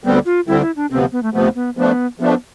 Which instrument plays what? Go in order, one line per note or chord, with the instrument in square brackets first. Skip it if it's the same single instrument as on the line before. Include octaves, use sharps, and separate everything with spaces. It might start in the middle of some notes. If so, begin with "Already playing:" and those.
[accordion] D2 D3 G3 C4 [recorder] B3
[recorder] F4
[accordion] D2 D3 G3 C4 [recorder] E4
[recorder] E4
D4
[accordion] D2 C3 F3 B3 [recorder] C4
[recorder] B3
A3
[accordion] D2 C3 F3 B3 [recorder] A3
[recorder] B3
[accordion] F3 A3 D4 [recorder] B3
[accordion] F3 A3 D4 [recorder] B3